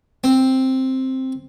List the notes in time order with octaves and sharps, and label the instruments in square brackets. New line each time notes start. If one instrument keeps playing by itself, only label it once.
[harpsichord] C4